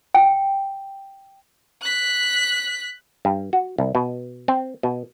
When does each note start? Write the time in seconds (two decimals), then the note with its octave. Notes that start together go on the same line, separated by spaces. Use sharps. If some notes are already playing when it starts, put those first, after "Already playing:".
0.15 G5
1.82 F#6 B6
3.25 G2
3.53 F#4
3.78 C2
3.95 B2
4.48 C4
4.83 B2